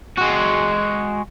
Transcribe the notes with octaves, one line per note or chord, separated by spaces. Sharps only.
G#3 F#4